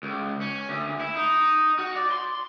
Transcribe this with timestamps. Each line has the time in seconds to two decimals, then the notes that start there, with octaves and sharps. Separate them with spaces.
0.03 C#2
0.41 C#4
0.69 D2
1.01 E4
1.16 D#4
1.79 F#4
1.96 D5
2.12 C6